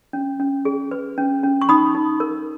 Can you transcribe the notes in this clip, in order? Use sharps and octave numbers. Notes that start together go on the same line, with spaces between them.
C#4
C#4
G#4
B4
C#4
C#4
C#6
D#4 B5 D#6
D#4
A#4